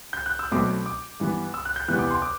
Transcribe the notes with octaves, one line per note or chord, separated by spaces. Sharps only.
G6
F#6
E6
B1 B2 A3 C4 D6
D6
G2 E3 B3
E6
F#6
G6
E2 C3 E3 B3 F#6
D6
C6
D6